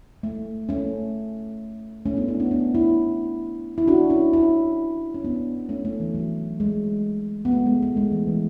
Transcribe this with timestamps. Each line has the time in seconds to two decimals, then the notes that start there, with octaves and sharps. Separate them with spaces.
0.23 A3
0.69 A3 C#4
2.05 A3 C#4
2.17 B3 D4
2.28 C#4 E4
2.40 B3 D4
2.51 B3 D4
2.74 C#4 E4
3.78 E4
3.88 D4 F#4
4.10 C#4 E4
4.33 C#4 E4
5.14 C#4
5.24 B3 D4
5.69 A3 C#4
5.85 A3
6.00 E3
6.15 F#3
6.60 G#3
7.45 B3
7.52 A3
7.66 G#3 B3
7.82 A3
7.97 G#3
8.12 E3
8.27 E3